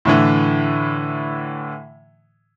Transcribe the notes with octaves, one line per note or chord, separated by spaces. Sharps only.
A2 D3 E3